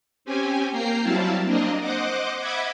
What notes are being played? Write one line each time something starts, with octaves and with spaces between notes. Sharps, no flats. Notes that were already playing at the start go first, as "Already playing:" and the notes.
C4 C#4 G4 G#5
A#3 G5 A#5 C7
F#3 G3 C4 E4 F5 A5
A#3 C4 D4 A#4 D#5
C5 D#5 F#5 D6
D#5 E5 F#5 B5 D6 G#6